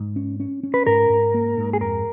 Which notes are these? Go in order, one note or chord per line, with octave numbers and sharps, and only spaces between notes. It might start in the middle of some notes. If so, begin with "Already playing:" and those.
Already playing: G#2
C#4
C#4
C#4
B4
G#2 A#4
G#2
A#3
G#2
G#4
F2 A#4